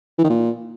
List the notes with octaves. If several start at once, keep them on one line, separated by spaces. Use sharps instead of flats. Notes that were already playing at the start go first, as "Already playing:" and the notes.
E3
D#3
A#2